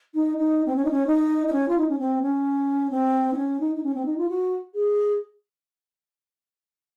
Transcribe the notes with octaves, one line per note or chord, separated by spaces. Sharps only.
D#4
D#4
C4
C#4
D#4
C#4
D#4
D#4
C#4
F4
D#4
C#4
C4
C#4
C4
D#4
C#4
D#4
D#4
C#4
C4
D#4
F4
F#4
G#4